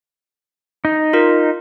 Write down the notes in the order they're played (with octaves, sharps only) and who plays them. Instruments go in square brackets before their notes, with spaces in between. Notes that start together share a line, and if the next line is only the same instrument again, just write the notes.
[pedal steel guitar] D#4
[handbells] F4 A#4 D#5